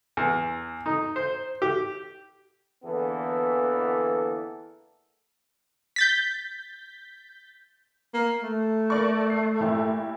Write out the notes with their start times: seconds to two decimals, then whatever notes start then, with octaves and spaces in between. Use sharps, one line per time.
0.17 E2
0.86 D#4
1.16 C5
1.62 G4
2.84 E2 D3 E3 A#3 B3 A4
5.96 G6 A6 B6
8.14 A#3
8.43 A3
8.90 A#3 D5 C#6
9.30 C7
9.60 A#2 E4 G4